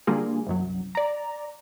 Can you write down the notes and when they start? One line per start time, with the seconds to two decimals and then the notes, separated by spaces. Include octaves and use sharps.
0.07 D3 G3 A#3 F4 G#4
0.47 C2 F#2 F#3
0.95 D5 A#5